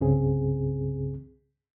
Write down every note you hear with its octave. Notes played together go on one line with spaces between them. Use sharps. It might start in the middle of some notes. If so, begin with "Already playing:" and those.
C2 G2 C#3 C4 G#4